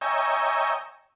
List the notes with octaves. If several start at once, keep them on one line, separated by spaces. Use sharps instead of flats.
C#5 D#5 E5 G5 G#5 A#5